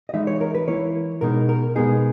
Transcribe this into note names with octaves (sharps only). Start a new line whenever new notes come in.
D#5
E3 G#3 D#4 E5
C#5
A#4
B4
E3 A#3 E4 C#5
B2 G#3 D#4 A#4
A#4
B2 G#3 B3 D#4 G#4